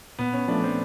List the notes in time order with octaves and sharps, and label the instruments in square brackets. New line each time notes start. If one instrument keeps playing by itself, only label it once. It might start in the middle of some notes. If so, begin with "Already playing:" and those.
[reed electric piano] A#2 [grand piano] B3
[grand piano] C#4
[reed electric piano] F3 A3 [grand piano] D4
[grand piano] C4